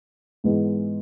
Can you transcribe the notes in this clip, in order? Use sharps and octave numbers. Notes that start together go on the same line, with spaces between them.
G#2 E3 G#3 B3